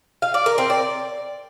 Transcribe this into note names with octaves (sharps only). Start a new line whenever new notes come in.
F5
D5
A#4
C4
D5